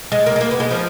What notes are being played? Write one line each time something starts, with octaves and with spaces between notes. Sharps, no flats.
G#3
A#3
G#3
A#3
B3
G#3
F3